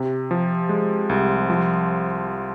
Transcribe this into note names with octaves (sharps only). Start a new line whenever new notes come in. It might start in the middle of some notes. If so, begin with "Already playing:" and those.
Already playing: C3
F3
G#3
C2
F3